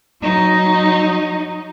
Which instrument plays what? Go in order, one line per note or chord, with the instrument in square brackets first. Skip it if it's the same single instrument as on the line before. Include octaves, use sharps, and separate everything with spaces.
[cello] F#3 D#4